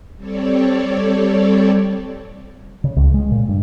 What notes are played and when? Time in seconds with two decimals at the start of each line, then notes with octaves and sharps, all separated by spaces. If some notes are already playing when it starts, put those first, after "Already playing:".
0.16 G3 C4 A4 C#5 D5
2.84 C#3
2.96 C#2
3.14 G#3
3.32 A#2
3.49 G2